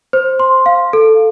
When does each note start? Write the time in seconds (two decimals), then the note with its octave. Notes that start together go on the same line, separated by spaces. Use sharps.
0.13 C5
0.40 C6
0.66 F5
0.93 A4